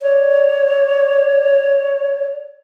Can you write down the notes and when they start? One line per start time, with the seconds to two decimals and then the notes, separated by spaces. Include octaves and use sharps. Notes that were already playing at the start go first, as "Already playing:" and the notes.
0.01 C#5 D5